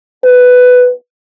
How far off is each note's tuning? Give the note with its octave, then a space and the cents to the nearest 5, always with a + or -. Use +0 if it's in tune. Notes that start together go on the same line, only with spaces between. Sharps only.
B4 +10